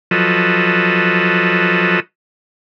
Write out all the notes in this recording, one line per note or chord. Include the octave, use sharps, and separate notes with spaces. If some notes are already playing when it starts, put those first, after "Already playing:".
F3 F#3 A4 B4 D#5